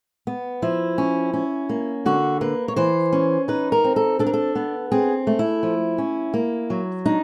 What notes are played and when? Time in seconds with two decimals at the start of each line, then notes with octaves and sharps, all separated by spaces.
0.27 B3
0.62 F3 E4
0.98 C#4
1.33 C#4
1.69 A#3
2.06 D3 F#4
2.41 A#3 B4
2.68 C#5
2.76 E3 C5
3.13 C#4
3.48 D#4 B4
3.72 A#4
3.84 C4
3.96 A4
4.19 D4 A4
4.26 A#4
4.34 A4
4.55 B3
4.92 C4 G#4
5.27 A3
5.39 E4
5.63 F3
5.98 C#4
6.34 A#3
6.70 F#3
7.06 D4 D#4